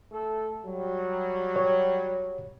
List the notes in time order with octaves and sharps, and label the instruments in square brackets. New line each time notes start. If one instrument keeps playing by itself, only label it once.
[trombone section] A3 A4
F#3 G3
[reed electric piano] C#5